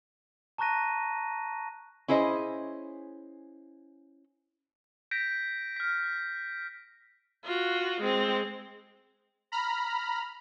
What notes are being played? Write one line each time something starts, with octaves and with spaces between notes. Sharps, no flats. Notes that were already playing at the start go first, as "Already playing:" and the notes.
A5 A#5 C#6 F#6 A#6 D#7
C#4 E4 G#4 C5 D#5
G6 A#6 B6 D7
F6 B6
F4 F#4
G#3 C4
A#5 B5 F6